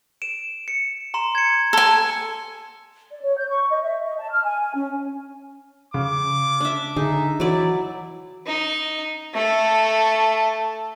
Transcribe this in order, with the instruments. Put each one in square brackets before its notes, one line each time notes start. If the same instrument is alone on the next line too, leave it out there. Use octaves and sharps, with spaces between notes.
[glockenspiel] D7 E7
C#7
A#5 C6 E7
G#6 C#7
[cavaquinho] A4 G#5
[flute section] D5
C#5
G6
C#6
D#5
E5
D#5
A5
F6
G#5
G#5
C#4
[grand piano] C#3 [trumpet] D6
[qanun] D4 E5
[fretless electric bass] D3 [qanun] D#4 [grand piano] G#4 [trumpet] E5
[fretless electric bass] E3 [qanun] F#3 D5 [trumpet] E4
[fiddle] D#4
A3 A4